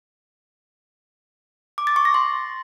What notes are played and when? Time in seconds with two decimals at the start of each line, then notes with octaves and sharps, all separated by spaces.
1.78 D6
1.87 A6
1.96 C#6
2.05 A#6
2.14 C6